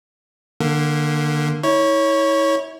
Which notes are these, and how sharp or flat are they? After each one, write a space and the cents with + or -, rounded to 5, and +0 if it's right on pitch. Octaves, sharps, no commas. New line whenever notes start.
D3 +25 A#3 +0
E4 -35 C#5 +0